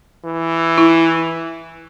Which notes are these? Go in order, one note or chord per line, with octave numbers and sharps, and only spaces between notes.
E3
E4